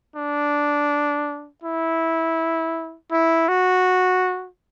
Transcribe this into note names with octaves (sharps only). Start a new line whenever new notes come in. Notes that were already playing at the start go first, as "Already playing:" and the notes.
D4
E4
E4
F#4